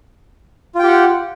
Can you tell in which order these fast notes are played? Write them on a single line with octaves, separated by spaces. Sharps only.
F4 G5 G4 F#5